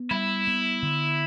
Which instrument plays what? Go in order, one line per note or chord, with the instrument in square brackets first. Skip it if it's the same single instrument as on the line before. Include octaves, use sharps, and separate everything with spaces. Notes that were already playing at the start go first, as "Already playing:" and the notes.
Already playing: [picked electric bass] B3
[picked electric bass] G3 [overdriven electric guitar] E4
[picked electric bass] B3
D3